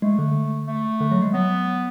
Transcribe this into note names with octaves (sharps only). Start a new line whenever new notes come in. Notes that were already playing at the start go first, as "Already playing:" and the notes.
G#3 A3
D3
A3
D3
F#3
G#3
F#3 B3